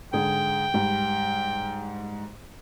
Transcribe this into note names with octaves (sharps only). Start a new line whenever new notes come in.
G#2 D3 G#4 G5
G#2 G3